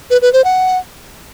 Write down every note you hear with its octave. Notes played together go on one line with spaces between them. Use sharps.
B4
B4
C5
F#5